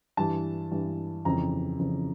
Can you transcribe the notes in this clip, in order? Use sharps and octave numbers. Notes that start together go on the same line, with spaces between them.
G2 E3 A5
G2 E3
F2 C#3 E3 A#5
F2 C#3 E3